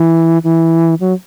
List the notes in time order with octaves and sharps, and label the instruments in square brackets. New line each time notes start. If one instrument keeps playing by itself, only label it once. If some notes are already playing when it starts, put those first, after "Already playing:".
Already playing: [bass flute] E3
E3
F#3